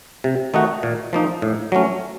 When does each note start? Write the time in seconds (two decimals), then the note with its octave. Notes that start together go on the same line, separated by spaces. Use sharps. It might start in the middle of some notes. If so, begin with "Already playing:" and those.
0.24 C3
0.54 D#3 A3 D#4 F#4
0.83 A#2
1.13 F3 A#3 D#4
1.42 A2
1.72 F#3 A3 C#4